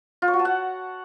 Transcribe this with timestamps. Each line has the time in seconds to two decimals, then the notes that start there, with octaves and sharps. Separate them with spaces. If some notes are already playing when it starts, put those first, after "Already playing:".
0.22 F4
0.28 C#5
0.34 F#4
0.39 A5
0.45 F#5